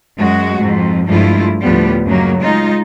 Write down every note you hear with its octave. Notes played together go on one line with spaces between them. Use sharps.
F#2 G#3 F#4
F2 G#2
G2 F3 G#3 A3 E4 F4
D2 A2 F3 G3 B3
F#2 C#3 F#3 G#3 A#3
G#3 D#4 F4